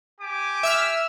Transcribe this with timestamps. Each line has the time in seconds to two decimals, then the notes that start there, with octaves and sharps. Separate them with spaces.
0.21 G4 G#5 D6
0.63 E5 E6 F6